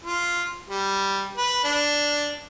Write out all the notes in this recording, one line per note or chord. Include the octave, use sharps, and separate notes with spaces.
F4
G3
B4
D4